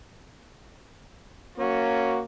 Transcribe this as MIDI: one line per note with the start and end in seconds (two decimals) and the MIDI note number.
1.58 2.23 58
1.58 2.20 61
1.58 2.20 66